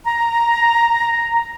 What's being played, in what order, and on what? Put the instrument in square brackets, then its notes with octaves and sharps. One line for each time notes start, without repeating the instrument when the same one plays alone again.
[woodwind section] A#5